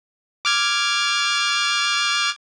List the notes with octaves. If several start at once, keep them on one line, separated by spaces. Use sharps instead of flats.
D6 F6 G#6